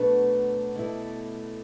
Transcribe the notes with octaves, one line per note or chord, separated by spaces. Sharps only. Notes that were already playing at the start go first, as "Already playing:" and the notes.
Already playing: B2 F#3 A3 D4 B4
B2 A3 E4 D5